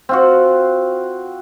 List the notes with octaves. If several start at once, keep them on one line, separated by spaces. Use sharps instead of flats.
C4 F4 F#4